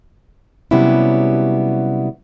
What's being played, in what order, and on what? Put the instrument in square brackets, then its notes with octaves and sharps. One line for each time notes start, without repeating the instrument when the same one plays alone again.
[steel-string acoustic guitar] C3 F#3 G3 B3 C#4 E4